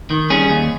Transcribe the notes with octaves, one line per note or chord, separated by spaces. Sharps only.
D#3
G3 C#4 G#4
D#2